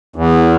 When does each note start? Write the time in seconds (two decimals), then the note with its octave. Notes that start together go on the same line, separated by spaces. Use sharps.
0.16 E2